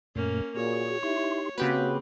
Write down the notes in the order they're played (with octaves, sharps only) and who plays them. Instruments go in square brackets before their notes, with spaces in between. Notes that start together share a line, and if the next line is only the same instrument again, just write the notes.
[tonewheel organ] F#2 A#2 A3 [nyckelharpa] A#3 C#4
[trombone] A#2 [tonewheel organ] F#4 G#4 [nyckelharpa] C#5
[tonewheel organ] D#4 G4 C6 [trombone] E4
[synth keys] C#3 G4 B4 [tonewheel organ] A#3 [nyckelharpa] C4 [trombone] F#4